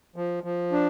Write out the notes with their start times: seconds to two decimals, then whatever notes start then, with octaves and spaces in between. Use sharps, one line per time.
0.16 F3
0.43 F3
0.72 D4